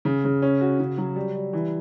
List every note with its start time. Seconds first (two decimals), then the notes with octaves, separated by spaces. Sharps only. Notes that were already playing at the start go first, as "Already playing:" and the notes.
0.05 C#3
0.25 C#3
0.42 C#4
0.61 F#4
0.80 C#3
0.98 F#3
1.16 G3
1.35 G3
1.53 E3